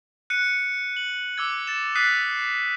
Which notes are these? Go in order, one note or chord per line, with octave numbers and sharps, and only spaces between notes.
F#6 C#7 D#7
F#7
D6 E6 G#6
A6 E7
D#6 F#6 A6 B6 C7 D#7